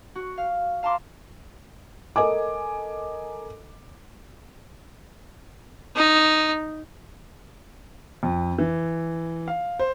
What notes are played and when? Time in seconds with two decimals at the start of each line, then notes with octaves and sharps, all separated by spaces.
0.15 F#4
0.38 F5
0.83 F5 A5 A#5 C6 D6
2.16 A4 A#4 D#5 G#5 D6
5.96 D#4
8.23 F2
8.59 E3
9.48 F5
9.79 C5